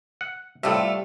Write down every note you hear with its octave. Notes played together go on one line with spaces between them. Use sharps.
F#5
A2 C3 G3 A3 F4